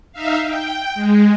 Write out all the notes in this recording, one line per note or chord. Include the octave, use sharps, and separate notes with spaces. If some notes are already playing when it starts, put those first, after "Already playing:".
D#4 E5 F5
G5
G#3